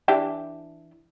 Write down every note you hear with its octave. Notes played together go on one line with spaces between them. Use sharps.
E3 D4 G4